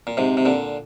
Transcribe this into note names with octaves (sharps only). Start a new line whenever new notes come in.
A#2
G#2 C3
C3
A#2 D3